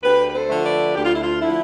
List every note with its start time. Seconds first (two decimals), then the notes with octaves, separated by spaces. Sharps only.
0.03 D2 G4 B4
0.29 B4
0.33 A4 C5
0.49 D3 F3 A3
0.64 B4 D5
0.95 D2 G4
1.04 F4
1.14 E4
1.23 F4
1.41 D3 F3 A3 E4